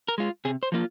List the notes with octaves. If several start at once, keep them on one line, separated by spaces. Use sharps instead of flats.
A#4
G#3 F4
C3 G#4
C5
F3 A#3 F4